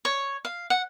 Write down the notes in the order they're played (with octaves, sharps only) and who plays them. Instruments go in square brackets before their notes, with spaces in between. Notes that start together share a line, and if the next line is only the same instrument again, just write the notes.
[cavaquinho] C#5
F5
F#5